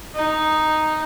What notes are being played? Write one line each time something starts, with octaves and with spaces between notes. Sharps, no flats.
D#4